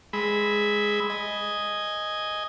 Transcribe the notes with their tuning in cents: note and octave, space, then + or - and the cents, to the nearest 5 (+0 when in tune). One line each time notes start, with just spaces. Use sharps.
G#3 +0 B5 +0 E6 -20
D#5 +0 G#5 +0